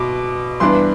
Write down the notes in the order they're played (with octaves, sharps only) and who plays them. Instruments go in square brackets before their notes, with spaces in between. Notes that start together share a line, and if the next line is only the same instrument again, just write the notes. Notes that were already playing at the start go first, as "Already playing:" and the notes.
Already playing: [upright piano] B2 D6
G2 E3 B3 D4 C6